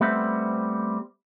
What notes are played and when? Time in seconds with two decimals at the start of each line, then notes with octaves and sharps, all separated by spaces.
0.01 G3 A3 B3 C4 C5 E5